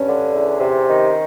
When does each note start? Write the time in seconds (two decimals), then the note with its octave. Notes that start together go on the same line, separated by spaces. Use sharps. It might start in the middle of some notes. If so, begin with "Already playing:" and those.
Already playing: G2 C#4
0.08 D3
0.34 E2
0.60 C3
0.86 D#3